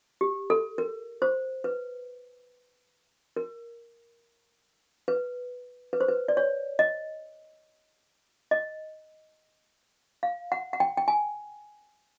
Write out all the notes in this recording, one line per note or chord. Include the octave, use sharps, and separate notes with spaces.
G4
A4
A#4
C5
B4
A#4
B4
B4
C5
B4
D5
C#5
D#5
D#5
F5
F#5
F#5
G5
G5
G#5